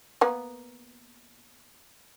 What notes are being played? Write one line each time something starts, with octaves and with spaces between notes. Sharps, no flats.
A#3 B3